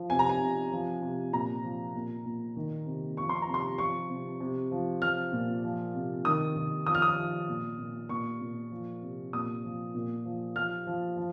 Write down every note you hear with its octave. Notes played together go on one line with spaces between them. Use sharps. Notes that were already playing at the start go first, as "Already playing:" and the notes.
Already playing: F3
C3 G#5
A#5
G#5
C3
F3
C3
A#2 A#5
F3
A#2
A#2
D#3
C3
F3 C#6
C6
A#5
C3
C6
F3 C#6
C3
C3
F3
F3 F6
A#2
F3
C3
D#3 D#6
D#3
F3 D#6
F6
D#6
F3
A#2
A#2
A#2 C#6
A#2
F3
C3
A#2 D#6
F3
A#2
F3
F3 F6
F3
F3